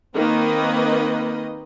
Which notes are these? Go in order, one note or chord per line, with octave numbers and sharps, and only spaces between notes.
D#3 A#3 C4 B4 D#5